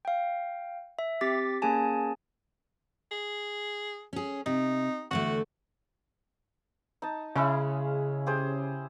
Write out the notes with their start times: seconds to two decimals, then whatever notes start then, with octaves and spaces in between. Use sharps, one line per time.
0.05 F5 G5
0.99 E5
1.21 C4 G4 D6 A6 B6
1.62 A#3 C#4 G#4 G#5 A5
3.11 G#4
4.13 C#4 G#4
4.46 C3 D#4
5.11 E2 D3 A3 F#4
7.02 D#4 A5
7.36 C#3 G#3 C#4 E4
8.26 G4 G#4 C5